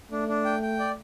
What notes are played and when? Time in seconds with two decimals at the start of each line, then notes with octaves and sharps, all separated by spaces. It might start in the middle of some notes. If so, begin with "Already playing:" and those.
0.11 A3 D4
0.28 D4
0.45 G5
0.62 G5
0.79 D5